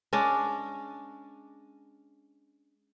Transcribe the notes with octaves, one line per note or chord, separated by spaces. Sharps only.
G#3 C#4 D4